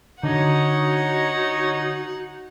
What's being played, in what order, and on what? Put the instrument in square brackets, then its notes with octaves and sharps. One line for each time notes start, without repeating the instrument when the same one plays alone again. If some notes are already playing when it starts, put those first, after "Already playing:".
[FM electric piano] D3 [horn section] D#4 C#5 [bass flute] F#4 [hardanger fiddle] F#5